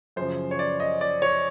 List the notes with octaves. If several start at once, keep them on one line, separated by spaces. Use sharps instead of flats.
F#2 C#3 F3 C5
C#5
D5
D#5
D5
C#5